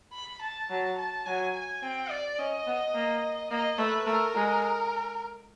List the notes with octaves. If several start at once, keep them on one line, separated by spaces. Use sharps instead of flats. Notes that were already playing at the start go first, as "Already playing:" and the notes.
B5
A5
F#3 A5
A5
F#3 G#5
G#5
C4 G5
D5
C#4 D#5
B3
A#3
A#3 D#5
A3 B4
A3 A#4
G#3